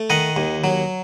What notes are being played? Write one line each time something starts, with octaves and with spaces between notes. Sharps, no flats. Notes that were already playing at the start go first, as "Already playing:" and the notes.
Already playing: A3
D#3 D#5 F#5
D#2
F#3